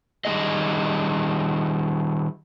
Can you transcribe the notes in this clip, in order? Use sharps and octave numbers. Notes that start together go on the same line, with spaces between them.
D#3 G3 B3 D4 G#4 D#5